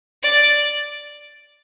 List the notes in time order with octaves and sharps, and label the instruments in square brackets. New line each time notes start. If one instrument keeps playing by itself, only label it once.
[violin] D5